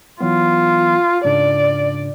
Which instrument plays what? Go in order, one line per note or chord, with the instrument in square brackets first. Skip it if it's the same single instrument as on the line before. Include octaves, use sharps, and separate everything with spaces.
[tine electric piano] E3 F#3 B3 [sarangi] F4
[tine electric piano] G#2 C#3 D4 [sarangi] D5